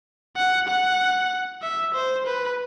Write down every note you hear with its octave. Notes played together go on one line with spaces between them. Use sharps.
F#5
F#5
E5
C5
B4